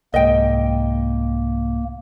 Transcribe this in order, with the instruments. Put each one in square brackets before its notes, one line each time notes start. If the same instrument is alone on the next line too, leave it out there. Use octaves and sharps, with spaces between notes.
[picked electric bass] C2 G#2 [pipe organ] A#3 [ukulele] D#5 G5